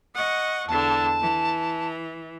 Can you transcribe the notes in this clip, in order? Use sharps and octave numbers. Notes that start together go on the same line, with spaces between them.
D#5 F#5 C#6
E2 D3 A5
E3